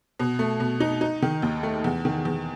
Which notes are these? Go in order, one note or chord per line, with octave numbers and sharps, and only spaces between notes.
B2
A3
B2
D#4
D#4
D#3
D#2
A3
E2
D#3
E2